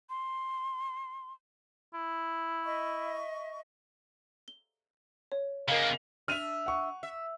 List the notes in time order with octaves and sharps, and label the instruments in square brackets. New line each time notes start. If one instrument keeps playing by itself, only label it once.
[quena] C6
[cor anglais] E4
[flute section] D#5 E5 C#6
[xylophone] G7
C#5
[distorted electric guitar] C#3 A#3 [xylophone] A#4 D#5 F5
[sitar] D4 E5 [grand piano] F6 D#7 F7
[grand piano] F#5 C#6
[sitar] E5